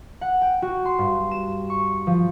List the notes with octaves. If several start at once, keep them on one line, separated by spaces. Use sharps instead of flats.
F#5
G5
F#4
C6
G2
E7
C#6
F3